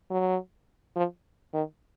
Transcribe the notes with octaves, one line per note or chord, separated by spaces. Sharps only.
F#3
F3
D#3